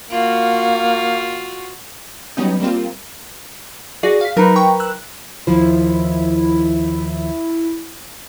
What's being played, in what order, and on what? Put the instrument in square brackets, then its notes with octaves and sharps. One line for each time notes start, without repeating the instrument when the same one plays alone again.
[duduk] A#3 [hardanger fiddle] F4 F#4
[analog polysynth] F#3 G3 B3 C#4 D#4
G3 A#3 C4 F4
[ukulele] F#4 [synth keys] G#4 D5 A#6
[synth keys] F5 B6
[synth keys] F#3 D#4 [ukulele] A#4 B4
[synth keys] G5 A#5 C#6
E6 F#6
[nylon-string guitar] D#2 F3 C5 [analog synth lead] E4